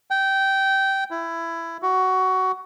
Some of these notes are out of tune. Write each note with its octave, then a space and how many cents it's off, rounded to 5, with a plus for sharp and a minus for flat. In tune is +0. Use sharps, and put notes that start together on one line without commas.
G5 -15
E4 +15
F#4 +15